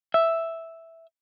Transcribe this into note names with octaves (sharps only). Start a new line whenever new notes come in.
E5